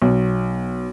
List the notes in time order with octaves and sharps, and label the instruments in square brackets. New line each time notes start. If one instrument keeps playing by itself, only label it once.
[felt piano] B1